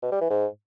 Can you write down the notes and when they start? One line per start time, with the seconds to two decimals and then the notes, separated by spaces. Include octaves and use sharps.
0.02 B2
0.12 G3
0.21 E3
0.30 G#2